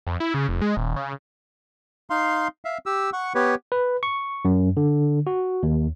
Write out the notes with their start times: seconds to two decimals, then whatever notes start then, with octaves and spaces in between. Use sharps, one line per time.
0.07 F2
0.20 E4
0.34 C#3
0.49 F1
0.62 G#3
0.77 D#1
0.96 C#3
2.10 D#4 F5 C6
2.65 E5 F5
2.86 G4 E6
3.13 F#5 C#6
3.35 B3 G4 B4 C#5
3.72 B4
4.03 C#6
4.45 F#2
4.77 D3
5.27 F#4
5.63 D#2